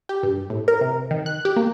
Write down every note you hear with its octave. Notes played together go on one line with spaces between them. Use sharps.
G4
G2
A2
A#4
C3
D#3
F#6
G4
A#3